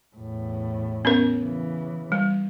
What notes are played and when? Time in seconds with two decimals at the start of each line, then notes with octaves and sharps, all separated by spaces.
0.16 E2 A2
1.05 B3 C#4 A#4
1.42 C#3 E3
2.12 G3